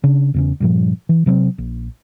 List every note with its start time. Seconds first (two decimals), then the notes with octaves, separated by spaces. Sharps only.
0.04 C#3 D4
0.34 E2 C#3 C#4
0.60 G2 A#2 F3
1.09 E3
1.26 C3 F#3 B3 C4
1.58 A#1